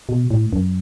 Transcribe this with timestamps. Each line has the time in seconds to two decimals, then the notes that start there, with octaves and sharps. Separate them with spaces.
0.09 B2
0.31 A2
0.53 F#2